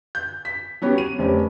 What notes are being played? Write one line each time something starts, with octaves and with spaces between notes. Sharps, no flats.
G6
B6
F#3 B3 C#4 G4
D#7
F1 C4 C#4 G4